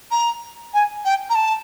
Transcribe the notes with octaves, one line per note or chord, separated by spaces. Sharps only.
A#5
G#5
G5
A#5
A5